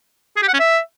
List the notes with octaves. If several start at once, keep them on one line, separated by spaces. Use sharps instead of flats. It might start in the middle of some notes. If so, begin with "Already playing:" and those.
G#4
G4
F#5
C#4
E5